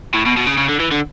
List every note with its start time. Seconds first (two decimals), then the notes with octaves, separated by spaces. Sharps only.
0.14 A2
0.26 B2
0.37 B2
0.47 C#3
0.58 C#3
0.69 D3
0.80 E3
0.92 D3